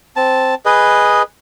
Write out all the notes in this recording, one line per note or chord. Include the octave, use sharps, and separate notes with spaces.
C4 A5
G#4 B4 D#5